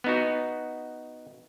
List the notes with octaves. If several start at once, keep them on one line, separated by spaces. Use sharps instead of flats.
B3 D#4 F#4